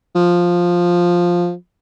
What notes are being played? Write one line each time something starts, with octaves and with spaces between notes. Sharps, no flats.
F3